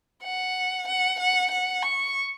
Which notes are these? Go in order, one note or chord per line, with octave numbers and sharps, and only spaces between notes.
F#5
F#5
F#5
F#5
C#6